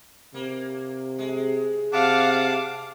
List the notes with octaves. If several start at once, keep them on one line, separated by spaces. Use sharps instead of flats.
C3 A#3
G#3
C3 F5 F#5 A5 D6